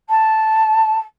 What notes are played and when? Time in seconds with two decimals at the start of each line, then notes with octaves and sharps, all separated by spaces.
0.09 A5